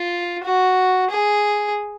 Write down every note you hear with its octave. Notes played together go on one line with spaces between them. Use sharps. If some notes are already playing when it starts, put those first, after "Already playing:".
Already playing: F4
F#4
G#4